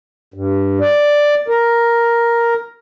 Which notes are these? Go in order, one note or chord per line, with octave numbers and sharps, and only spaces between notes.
G2
D5
A#4